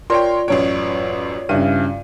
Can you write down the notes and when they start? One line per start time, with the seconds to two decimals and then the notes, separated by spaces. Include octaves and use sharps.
0.10 F4 A#4 C#5 D5 G5 C6
0.48 A1 F#2 C#5 D7
1.49 G2 C#3 E4 D#7